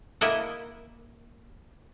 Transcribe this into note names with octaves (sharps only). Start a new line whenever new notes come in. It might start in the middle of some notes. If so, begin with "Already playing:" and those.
A#3 E4 D#5 E5 F#5